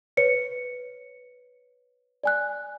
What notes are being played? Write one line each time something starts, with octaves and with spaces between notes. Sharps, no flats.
B4 C#5 C#7
D5 G#5 F#6